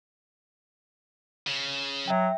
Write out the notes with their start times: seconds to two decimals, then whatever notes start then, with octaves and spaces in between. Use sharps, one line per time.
1.47 C#3
2.08 F#3 E5 G5